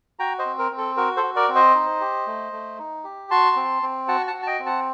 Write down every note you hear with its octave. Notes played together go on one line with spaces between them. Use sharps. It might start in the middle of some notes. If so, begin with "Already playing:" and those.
F#4 G5 A#5
C5 D#5
C4
A#4
C4
A4
F#4 A#4
A4 C5
F#4
A#4 D5
C4
C5 D#5
D#4
G4
A3
A3
D#4
G4
F#4 A5 C6
C4
C4
F#4 F#5 A5
F#5 A5
F#4
A5
D#5 G5
C4
F#5 A5